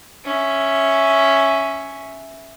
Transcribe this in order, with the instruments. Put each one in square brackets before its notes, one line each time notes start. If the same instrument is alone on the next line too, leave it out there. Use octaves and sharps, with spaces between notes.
[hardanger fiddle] C#4 E5